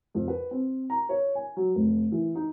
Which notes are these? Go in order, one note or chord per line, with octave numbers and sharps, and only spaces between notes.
F2
B4
C4
A#5
C#5
G#5
F#3
F1
E3
D#4